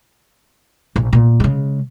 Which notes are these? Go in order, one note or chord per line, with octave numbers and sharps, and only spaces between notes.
A#1
A#2 B3
C#3 G#3